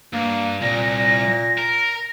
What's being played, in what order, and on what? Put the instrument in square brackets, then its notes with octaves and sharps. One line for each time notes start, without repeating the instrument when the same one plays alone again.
[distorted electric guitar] G2 [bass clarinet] A#3
[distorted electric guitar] C2 [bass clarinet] A#2 [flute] A#6
[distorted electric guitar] A#4